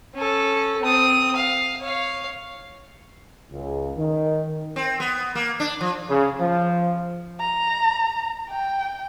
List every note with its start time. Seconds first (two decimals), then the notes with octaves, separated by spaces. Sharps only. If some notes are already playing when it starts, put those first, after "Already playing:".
0.15 C#4 A4
0.81 C4 D#6
1.36 F5
1.81 C#5 F5
3.51 C#2
3.97 D#3
4.76 C4
5.00 B3
5.35 A#3
5.60 D4
5.81 F3
6.09 C#3
6.40 F3
7.40 A#5
8.50 G5